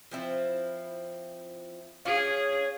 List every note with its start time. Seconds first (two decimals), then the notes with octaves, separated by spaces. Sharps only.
0.11 F3 C4 E4
2.05 C#4 G#4 C#5 F5